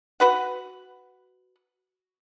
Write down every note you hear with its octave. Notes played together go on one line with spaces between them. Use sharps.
F#4 B4 F#5